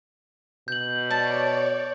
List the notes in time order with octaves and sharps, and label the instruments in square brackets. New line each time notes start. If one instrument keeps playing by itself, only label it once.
[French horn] B2 [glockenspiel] G6 F#7
[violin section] C#5 D5 [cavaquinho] A5